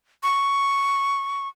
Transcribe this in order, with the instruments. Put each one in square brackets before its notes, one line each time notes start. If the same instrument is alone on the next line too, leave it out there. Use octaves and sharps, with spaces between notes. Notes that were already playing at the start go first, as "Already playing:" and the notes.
[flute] C#6